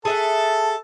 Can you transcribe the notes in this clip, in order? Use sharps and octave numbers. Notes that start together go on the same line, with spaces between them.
G#4 A4 E5 F#5 A5